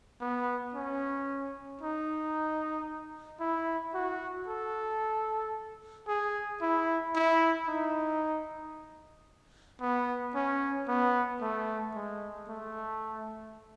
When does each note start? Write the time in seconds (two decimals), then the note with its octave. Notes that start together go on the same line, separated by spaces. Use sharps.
0.21 B3
0.74 C#4
1.81 D#4
3.40 E4
3.94 F#4
4.48 A4
6.08 G#4
6.62 E4
7.15 E4
7.68 D#4
9.81 B3
10.35 C#4
10.88 B3
11.41 A3
11.95 G#3
12.48 A3